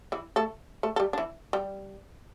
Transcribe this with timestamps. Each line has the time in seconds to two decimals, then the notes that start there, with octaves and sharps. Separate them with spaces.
0.12 E3 E4
0.36 A3 A4
0.83 A3 A4
0.96 A4
1.00 G3 G4
1.13 D4
1.18 E3 E4
1.53 G3 G4